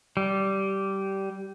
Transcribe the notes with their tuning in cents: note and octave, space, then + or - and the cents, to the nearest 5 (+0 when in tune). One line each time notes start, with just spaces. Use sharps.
G3 -15